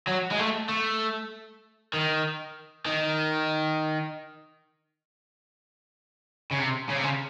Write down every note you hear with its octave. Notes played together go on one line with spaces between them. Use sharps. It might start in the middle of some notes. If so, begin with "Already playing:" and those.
F#3
G#3
A3
A3
D#3
D#3
C#3
C3
C#3
C3
C#3